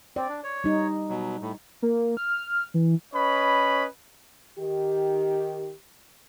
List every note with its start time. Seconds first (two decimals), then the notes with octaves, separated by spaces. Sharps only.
0.16 C4 D5
0.29 D4
0.44 C#5
0.64 G3 D#4
1.09 B2 F#3
1.41 A2
1.82 A#3
2.17 F6
2.74 E3
3.14 C#4 B4 C#5 D#5 B5
4.58 D#3 G4